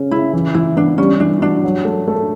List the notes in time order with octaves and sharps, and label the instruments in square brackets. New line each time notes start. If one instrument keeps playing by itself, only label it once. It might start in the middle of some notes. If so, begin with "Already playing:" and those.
Already playing: [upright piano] C#3 C#4
[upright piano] C#3 [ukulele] E4
[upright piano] E3
[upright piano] E3 [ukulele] E4
[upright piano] B3 [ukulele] D4
[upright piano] G3 [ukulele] C#4
[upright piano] E3 [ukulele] D4
[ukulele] D4 [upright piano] F#4
[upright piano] F#3
A3
A3